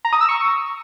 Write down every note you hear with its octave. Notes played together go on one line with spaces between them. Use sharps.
A#5
D#6
E6
C#6